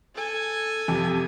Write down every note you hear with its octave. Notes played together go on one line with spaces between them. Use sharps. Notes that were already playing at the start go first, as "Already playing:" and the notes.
A4 G#5
F2 C3